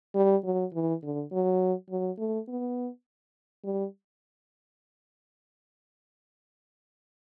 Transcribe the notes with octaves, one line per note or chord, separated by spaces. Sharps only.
G3
F#3
E3
D3
F#3
F#3
A3
B3
G3